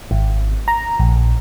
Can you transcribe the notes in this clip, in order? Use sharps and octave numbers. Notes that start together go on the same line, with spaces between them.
G#1
A#5
A#1